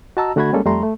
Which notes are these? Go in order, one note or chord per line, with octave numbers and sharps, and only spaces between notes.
F#4 D#5 A5 A#5 E6
D3 A3 F#4 F#5 B5 G#6
G3 G#3 A#3 C#4 A4
F2 G3 A3 A#5 C6
A3